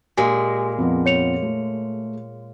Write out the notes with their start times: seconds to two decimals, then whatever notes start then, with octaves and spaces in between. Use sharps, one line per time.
0.17 A#2 G#3 G4 G#5
0.78 F2 F3 B3
1.06 C#5 C#7 F7
1.42 A3